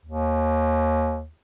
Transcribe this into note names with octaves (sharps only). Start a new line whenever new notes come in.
D#2